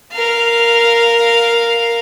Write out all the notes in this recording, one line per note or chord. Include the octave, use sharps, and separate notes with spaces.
A#4 F5